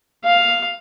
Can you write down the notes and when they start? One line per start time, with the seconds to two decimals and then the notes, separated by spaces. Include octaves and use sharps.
0.24 F5